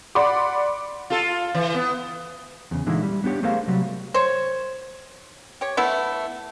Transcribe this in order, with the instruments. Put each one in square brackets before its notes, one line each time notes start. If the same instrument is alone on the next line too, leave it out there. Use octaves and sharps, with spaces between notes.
[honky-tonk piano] D5 F#5 B5 C6 D6
[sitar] F4 A4
E3
B3
[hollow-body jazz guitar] E2 C#3
A#2 D3 E3 G#3 D#4 E4
G3
B3 D4 G4 C#5
A3 G#4 A#4 C5 C#5 F5
C3 F#3 G3
[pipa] C5 C#5
G4 C#5
A3 B3 E4